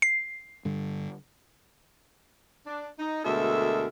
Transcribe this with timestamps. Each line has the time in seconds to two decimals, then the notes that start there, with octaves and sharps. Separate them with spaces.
0.02 C7
0.65 G2 D3 G3
2.66 D4
2.99 D#4
3.24 D2 B2 G#3 A4 A#4 E5